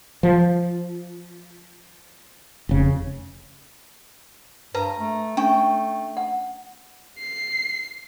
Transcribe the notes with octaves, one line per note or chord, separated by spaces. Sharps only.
F3
F1 C#3
G2 B4 A5 A#5
A3
A3 C#4 D4 G5 C#6
F#5
C7